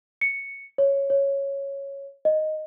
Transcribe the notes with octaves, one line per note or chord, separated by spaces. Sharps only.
C#7
C#5
C#5
D#5